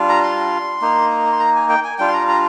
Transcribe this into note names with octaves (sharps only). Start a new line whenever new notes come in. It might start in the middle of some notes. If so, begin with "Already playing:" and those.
Already playing: G3 D4 F4
A#5
C6
A#3 D#4
C6
A#5
G#5
G5
G#5
G3 D4 F4 G5
C6
A#5
A#5